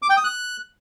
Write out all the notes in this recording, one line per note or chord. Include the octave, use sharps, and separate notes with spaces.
D6
G5
D#6
F#6